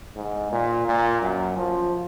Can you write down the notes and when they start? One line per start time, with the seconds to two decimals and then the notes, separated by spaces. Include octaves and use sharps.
0.16 G#2
0.52 A#2
0.87 A#2
1.22 F#2
1.57 F3